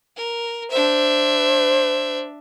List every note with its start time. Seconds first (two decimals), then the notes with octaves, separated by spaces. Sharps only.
0.16 A#4
0.71 D4 C5 E5